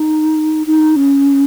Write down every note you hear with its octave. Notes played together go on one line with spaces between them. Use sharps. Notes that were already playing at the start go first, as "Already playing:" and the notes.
Already playing: D#4
D#4
C#4